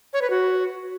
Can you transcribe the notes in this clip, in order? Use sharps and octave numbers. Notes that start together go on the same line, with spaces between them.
C#5
B4
F#4